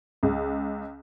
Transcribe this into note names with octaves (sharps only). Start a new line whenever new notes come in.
C#2